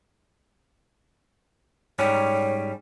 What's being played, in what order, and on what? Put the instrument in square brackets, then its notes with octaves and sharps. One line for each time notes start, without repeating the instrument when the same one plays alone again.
[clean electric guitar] G#2 G3 C#4 [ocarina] C#5